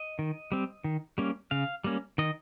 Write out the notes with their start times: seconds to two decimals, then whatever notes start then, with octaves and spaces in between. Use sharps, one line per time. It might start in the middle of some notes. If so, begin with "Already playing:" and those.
Already playing: D#5
0.19 D#3
0.52 G3 C4
0.84 D#3
1.18 G3 A#3 C#4
1.51 C#3 F5
1.84 G3 A#3 C#4
2.18 D#3 D#5